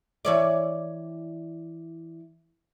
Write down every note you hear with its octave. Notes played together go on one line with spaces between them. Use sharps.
E3 C#5 D5